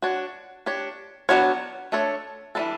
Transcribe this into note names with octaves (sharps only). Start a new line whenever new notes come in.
D4 F#4 C#5
D4 G4 C#5
F#3 B3 D4 F#4 C#5
A3 D4 A4 C#5
E3 G3 B3 D4 A4